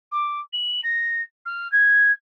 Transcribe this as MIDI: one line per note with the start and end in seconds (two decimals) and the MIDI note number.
0.12 0.39 86
0.53 0.81 102
0.83 1.22 94
1.45 1.70 89
1.72 2.11 92